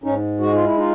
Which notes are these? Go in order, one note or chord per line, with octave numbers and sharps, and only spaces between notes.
G#2 C#4 D#4
G#3 F#4
F4
E4
D#4 F4